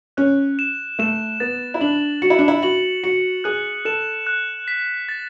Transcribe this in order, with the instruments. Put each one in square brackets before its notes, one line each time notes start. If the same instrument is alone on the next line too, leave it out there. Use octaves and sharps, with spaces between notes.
[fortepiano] C#4 [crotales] F#6
[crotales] E7
[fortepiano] A3 [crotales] E7
[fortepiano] B3 [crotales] A6
[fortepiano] E4
[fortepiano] D4 [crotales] F#7
[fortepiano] F#4 [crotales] C#7
[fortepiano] E4
D4
E4
[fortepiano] F#4 [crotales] F#7
[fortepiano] F#4 [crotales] C#7
[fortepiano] G#4 [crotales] F#6
[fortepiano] A4 [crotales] E7
[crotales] F#6
B6
A6